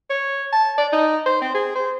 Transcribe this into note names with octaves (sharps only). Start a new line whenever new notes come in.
C#5
A5
D5
D#4
C5
C4
G#4
C5